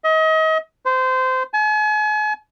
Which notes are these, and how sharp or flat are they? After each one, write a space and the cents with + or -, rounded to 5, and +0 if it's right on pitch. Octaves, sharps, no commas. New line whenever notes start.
D#5 +35
C5 -20
G#5 +40